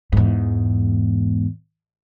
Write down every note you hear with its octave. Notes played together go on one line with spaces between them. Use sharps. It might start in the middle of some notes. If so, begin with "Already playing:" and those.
E2 G#2